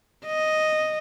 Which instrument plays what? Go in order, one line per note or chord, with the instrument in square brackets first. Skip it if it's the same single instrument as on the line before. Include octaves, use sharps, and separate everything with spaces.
[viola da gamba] D#5